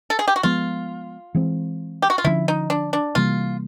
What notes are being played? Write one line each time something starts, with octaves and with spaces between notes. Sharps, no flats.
A4
G#4
G4
F#4
F3 G#3 B3 F4
E3 G#3 C4
G4
F#4
F4
D3 F3 G#3 C#4 E4
D#4
D4
D4
C3 E3 G3 A#3 F4